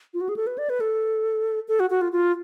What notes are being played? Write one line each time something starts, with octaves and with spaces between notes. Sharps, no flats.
F4
F#4
G#4
A4
B4
D5
B4
A4
A4
F#4
F#4
F4
F4